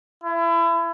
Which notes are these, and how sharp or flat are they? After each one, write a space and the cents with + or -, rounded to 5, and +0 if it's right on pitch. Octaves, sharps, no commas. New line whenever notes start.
E4 +30